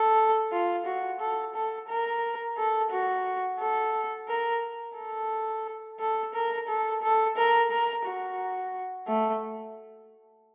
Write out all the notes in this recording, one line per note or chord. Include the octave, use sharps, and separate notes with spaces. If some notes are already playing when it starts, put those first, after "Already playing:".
Already playing: A4
F4
F#4
A4
A4
A#4
A4
F#4
A4
A#4
A4
A4
A#4
A4
A4
A#4
A#4
F#4
A3